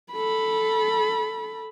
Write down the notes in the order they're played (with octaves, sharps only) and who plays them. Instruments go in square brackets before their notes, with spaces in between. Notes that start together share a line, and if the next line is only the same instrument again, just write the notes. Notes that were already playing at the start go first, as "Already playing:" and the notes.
[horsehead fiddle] A4 B5